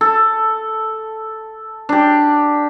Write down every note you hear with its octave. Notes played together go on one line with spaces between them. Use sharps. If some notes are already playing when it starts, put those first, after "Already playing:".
A4
D4 G4